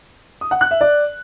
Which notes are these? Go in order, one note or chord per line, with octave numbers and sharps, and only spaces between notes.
D#6
F#5
F#6
E5
D5